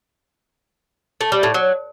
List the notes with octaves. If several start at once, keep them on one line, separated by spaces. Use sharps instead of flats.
A3
G3
A2
F#3